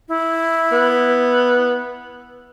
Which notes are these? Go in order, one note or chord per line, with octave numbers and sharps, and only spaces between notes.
E4
B3